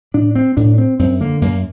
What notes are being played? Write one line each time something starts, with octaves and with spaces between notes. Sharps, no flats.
A2 D4
C4
A2 D4
C4
F#2 C4
D3 A#3
F#2 A#3